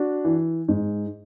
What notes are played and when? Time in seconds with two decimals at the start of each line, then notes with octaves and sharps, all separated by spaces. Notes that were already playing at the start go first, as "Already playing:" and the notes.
Already playing: D4 F#4
0.25 E3
0.68 G#2